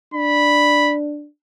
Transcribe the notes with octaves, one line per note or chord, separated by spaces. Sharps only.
D4 B5